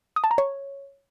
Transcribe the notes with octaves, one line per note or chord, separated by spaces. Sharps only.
D#6
A5
A#5
C#5